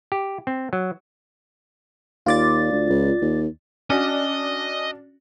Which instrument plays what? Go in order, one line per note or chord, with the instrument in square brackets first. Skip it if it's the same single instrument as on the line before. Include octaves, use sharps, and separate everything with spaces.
[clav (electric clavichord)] G4
C4
F#3
[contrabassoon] D#2 [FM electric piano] F4 D5 A6
[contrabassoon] D2
C#2
D#2
[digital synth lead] C#4 [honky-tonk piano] D4 F#4 [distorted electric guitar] D#5